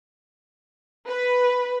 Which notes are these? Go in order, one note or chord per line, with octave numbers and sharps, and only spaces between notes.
B4